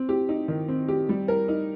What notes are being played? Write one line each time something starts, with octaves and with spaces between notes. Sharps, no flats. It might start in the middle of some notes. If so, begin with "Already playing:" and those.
Already playing: C4
G4
D#4
D#3
C4
G4
G3
A#4
D#4